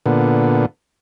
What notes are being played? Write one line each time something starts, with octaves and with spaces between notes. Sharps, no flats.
A#2 D3 B3